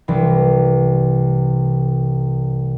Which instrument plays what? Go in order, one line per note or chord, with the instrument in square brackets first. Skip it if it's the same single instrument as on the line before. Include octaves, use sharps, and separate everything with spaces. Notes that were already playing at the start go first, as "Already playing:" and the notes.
[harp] C2 E3